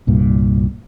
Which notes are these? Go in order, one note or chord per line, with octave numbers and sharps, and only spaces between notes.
C2 G2 A#2